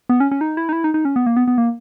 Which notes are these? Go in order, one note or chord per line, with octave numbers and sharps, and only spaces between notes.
B3
C#4
C#4
D#4
E4
D#4
E4
D#4
D#4
C#4
B3
A#3
B3
B3
A#3